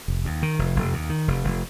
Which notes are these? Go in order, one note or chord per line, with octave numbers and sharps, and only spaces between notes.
F1
D#2
D#3
F1
F1
D#2
D#3
F1
F1